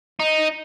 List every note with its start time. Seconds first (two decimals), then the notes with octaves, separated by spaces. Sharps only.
0.20 D#4